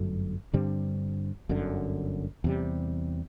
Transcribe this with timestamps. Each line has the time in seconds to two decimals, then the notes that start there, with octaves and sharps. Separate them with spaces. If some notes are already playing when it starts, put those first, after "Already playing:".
Already playing: G1 F#2 F#3 A3
0.53 G2 D3 G3 C4
1.49 G1 F#2 D3
2.44 E2 C3 G3